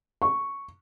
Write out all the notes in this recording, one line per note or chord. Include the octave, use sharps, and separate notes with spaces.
C#6